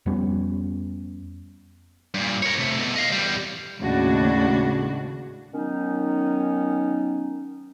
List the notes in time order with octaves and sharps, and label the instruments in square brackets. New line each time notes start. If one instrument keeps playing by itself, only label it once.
[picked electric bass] F2 G3 B3 C#4
[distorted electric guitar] G2 A#2
A#4 C#5
C3 A3
B2 A3
D#5 F5
E2 G3
[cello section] D#2 A2 C#3 G#3 D4 F#4
[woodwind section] D#3 F#3 B3 C#4 D#4